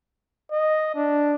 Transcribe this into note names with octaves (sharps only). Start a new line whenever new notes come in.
D#5
D4